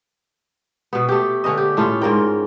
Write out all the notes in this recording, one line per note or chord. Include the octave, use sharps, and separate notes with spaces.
B2 B3
A3 G4
D3 C#4 B4 D#5
G4
A2 A3 C#4 F4
G#2 F4 A#4 G5